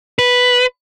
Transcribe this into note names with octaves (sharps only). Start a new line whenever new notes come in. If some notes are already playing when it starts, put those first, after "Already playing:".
B4